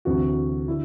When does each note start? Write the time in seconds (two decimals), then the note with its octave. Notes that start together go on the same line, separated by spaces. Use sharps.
0.05 D2 C3 E3 F#4
0.67 D3 E4